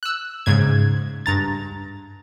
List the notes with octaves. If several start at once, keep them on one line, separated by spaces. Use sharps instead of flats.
E6 F#6
G#2 C#3 G#6
G2 A#5 A6